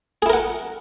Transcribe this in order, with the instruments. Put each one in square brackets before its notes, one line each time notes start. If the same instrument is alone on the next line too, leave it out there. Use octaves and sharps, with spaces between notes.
[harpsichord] G#4
E4
A#4
F#5